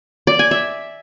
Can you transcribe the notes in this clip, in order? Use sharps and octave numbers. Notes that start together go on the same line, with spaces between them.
D5
G#5
E5